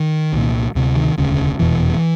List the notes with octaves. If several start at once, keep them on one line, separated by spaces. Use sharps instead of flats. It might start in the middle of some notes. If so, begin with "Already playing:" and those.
Already playing: D#3
C2 A#2
D2 C3
D#3
E1 D2 C#3
F1 E2 B2 E3